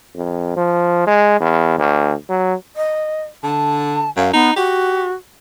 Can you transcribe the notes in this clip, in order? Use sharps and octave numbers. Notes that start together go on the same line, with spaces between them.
F2
F3
G#3
E2
D2
F#3
D#5
D3 A5
F#2 F5
B3 D#4
F#4 G4